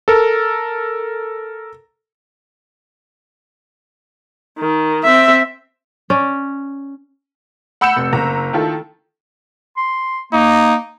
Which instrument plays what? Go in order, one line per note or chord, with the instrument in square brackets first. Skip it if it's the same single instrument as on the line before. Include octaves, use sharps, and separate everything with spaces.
[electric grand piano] A4 A#4
[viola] D#3
C4 E5
[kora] C#4 D5
[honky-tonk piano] F#5 B5 E6 G6 C#7 E7
F1
F#1 A#5
D#3 E4 F4 A4
[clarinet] C6
[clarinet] A#3 [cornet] D#4